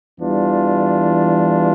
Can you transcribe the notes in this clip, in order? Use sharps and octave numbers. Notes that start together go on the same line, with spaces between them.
E2 E3 G3 D4 F4